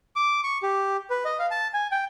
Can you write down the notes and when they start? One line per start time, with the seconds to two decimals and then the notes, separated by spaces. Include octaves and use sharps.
0.16 D6
0.44 C#6
0.63 G4
1.10 B4
1.25 D#5
1.39 F5
1.51 A5
1.74 G#5
1.91 G5